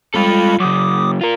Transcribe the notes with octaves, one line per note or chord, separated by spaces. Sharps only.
G3 G#3 F4 A4 B5
F#2 C#3 D6 D#6
F4 A#4